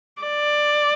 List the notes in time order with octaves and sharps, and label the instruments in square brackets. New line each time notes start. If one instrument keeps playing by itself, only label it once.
[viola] D5